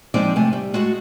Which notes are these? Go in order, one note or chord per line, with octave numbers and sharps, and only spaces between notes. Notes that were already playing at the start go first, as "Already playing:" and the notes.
F3 G#3 C4 D#4 G#4 D5
C3 A3 G#5
G3
G#3 A3 F#4 G#4